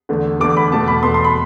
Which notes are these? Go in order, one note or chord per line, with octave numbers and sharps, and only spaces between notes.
E2 D3 A3
E2 D3 A3 D6
B5
E2 B2 A3 A5
B5
E2 B2 A3 C6
C6
B5